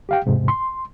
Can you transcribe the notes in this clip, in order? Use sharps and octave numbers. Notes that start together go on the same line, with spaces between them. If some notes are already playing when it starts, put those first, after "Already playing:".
G4 F5 G5
E2 G#2 C3
C6